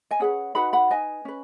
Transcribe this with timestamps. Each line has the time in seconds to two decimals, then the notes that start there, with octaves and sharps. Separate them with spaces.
0.11 D#5 G#5
0.19 C#4 G#4 B4 C#5 F#5
0.55 D#4 F#4 B4 F#5 B5
0.73 F#5 B5
0.91 D#4 B4 D#5 G#5
1.25 C#4 B4